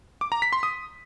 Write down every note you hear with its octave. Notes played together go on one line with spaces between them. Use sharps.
D6
A#5
B6
C6
D#6